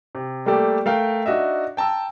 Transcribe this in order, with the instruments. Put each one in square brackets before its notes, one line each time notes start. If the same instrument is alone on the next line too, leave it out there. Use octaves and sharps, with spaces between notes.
[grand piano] C3
G3 A3 A#3 G4 A4 D5
A3 A#4 F5 G5
D4 D#4 F#4 D#5 E5
G5 A5 A#5 E6